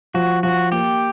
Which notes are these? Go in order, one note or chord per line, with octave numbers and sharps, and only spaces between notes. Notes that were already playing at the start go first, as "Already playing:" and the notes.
F3 F#4
F3 F#4
A#3 G4